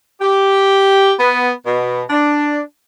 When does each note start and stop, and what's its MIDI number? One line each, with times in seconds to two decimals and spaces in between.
0.21 1.13 67
1.19 1.50 59
1.66 2.03 47
2.10 2.61 62